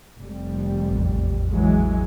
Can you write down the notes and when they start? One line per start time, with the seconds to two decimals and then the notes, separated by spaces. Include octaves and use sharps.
0.20 F1 F2 G3
0.91 A1 E2
1.50 E3 F#3 G#3